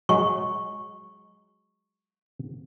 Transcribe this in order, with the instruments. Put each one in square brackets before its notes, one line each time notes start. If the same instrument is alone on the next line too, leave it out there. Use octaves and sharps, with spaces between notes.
[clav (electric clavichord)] F#3 G#3 [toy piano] C#6